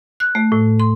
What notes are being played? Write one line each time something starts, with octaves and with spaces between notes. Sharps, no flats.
F#6
A3
A2
C6